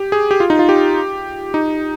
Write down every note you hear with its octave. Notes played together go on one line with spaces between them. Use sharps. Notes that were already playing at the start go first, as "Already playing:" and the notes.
Already playing: G4
G#4
G4
F4
D#4
F4
G4
D#4